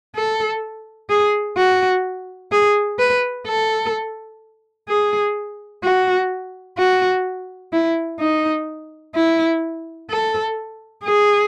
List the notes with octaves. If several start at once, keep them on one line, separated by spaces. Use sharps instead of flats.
A4
G#4
F#4
G#4
B4
A4
G#4
F#4
F#4
E4
D#4
E4
A4
G#4